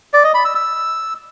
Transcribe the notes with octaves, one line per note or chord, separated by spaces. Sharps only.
D5
D#5
B5
E6
E6